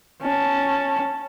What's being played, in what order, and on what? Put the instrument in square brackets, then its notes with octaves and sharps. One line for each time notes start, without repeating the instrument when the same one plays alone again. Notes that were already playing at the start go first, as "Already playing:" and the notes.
[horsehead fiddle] C#4 A5